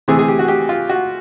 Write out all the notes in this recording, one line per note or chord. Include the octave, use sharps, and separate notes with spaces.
C3 E3 A3 C4 G#4
G#4
G4
F#4
G4
F4
F#4